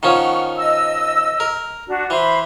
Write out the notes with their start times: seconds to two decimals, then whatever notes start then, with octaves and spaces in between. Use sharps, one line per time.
0.03 D#3 F3 C#4 F#5 C#6
0.56 D#5 E6
1.40 A#4
1.87 D4 F#4
2.10 E3 C5 B5